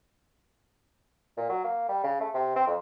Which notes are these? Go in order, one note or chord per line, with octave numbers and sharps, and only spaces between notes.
A#2
F#3
A#3
G3
C#3
A3
C3
C4
F2